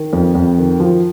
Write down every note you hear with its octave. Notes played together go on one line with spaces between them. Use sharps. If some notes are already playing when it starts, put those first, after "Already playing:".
Already playing: D#3
F2
F2
D#3
F3